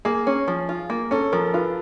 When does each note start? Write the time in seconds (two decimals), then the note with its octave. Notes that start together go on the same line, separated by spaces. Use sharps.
0.05 A#3 G#4
0.27 C#4
0.48 F3
0.69 F4
0.90 A#3
1.11 C#4 A4
1.32 F3 A#4
1.54 F4 B4